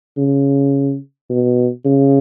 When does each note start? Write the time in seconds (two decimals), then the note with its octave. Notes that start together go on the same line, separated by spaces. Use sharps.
0.18 C#3
1.30 B2
1.85 C#3